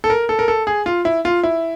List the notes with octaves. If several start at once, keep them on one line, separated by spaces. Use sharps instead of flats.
A4
A#4
A4
A#4
A4
G#4
F4
E4
F4
E4